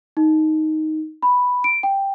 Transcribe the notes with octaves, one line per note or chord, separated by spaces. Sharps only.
D#4
B5
D7
G5